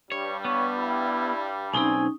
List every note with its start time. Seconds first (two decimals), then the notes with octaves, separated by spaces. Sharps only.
0.12 G2 G3 C#5
0.45 B3 C#5
0.78 E4
1.73 B1 C4 C#4 D#4 G#5